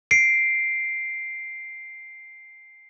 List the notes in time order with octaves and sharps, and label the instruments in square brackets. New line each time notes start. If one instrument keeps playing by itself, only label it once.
[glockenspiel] C7 D7